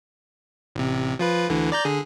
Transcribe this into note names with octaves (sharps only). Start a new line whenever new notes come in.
A1 C3
F3 F4 B4
D2 D3 E3
D5 A#5 G6
D3 G#4